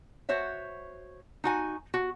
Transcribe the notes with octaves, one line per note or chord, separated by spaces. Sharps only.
F#4 C5 C#5 E5
D#4 F#4 G#5
F#4